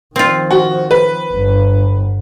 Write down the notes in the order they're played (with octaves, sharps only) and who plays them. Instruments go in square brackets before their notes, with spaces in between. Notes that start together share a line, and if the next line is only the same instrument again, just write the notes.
[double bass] D#3 F3 [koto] C4 F4
[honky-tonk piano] F#4
B4
[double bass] G1